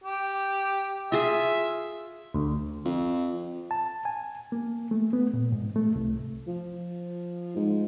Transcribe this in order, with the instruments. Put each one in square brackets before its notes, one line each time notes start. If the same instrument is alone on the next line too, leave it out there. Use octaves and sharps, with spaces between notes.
[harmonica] G4
[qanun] F4 G#4 [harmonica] E5
[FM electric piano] D2
[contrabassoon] F2
[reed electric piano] A5
G#5
A#3
A3
B3
A#2
G#2
A3
C2
[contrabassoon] F3
G#2